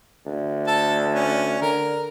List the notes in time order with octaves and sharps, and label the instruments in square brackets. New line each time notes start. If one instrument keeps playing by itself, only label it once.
[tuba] D2
[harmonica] A4 A5
C#4
[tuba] D3 [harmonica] A#4